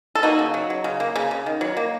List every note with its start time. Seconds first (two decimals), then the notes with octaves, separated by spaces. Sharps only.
0.15 A4
0.23 A#3 D#4 F#4
0.39 C#3
0.54 F#3
0.70 F#3
0.84 C#3
1.00 A#3
1.16 C#3
1.31 C#3
1.46 D#3
1.61 F#3
1.77 A#3